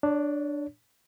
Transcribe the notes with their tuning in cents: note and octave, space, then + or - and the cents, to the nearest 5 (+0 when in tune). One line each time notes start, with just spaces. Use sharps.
D4 +5 C#5 +35